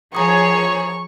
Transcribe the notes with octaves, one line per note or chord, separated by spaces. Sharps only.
F3 G#4 C#5 A#5 C#6 D#6